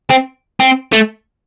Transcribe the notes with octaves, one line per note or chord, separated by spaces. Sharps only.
C4
C4
A3